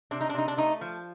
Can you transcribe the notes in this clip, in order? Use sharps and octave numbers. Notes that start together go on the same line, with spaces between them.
C3 D4
D#4
D4
C3 D#4
D4
A3 D#4
F3